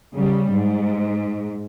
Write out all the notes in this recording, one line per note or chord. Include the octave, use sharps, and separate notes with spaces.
C#3 G3
G#2